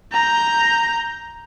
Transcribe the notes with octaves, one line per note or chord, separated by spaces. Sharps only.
A#5 G6